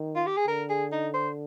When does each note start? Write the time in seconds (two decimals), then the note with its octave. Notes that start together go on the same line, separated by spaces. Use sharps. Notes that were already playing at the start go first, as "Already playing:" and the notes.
Already playing: D#3
0.15 F4
0.26 G4
0.37 G#4
0.47 D3 A#4
0.69 G#4
0.92 D#4
1.14 C5